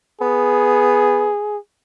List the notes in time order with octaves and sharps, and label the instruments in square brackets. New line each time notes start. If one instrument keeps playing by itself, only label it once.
[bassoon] B3 [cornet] G#4